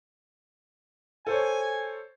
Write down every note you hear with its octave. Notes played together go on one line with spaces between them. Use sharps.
A4 C5 C#5 G#5